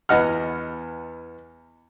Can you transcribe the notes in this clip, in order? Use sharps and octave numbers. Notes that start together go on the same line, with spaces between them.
E2 B3 D#5 F#5 F6